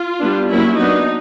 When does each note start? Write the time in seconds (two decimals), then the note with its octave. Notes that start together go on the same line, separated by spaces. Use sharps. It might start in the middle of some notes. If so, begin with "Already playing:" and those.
Already playing: F4
0.21 G3 B3 D4
0.50 F#3 A#3 C#4 E4
0.79 F#3 B3 D4 D#4